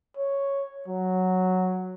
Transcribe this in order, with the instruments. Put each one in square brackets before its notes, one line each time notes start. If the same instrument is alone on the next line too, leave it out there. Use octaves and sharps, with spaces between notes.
[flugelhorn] C#5
F#3